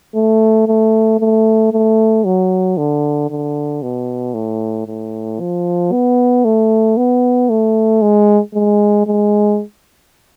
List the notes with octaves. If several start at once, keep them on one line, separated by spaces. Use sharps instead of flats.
A3
A3
A3
A3
F#3
D3
D3
B2
A2
A2
F3
B3
A3
B3
A3
G#3
G#3
G#3